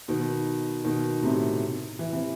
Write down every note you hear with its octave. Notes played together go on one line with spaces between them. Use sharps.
B2 D#3
B2 D#3
A2 C3
E3
C3 E3